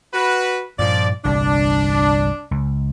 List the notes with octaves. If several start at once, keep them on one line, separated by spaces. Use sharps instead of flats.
F#4 B4
G2 A#2 F3 D5
G1 C2 C3 D4
C#2